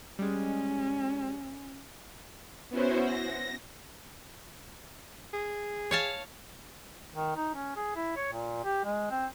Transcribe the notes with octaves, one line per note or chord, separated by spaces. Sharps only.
G3 G#3 C#4
B3 C#4 E4 F#4 C5
A#6
G#4
C#5 F5 A5
D#3
D#4
C#4
G#4
E4
C#5
A#2
G4
G#3
C4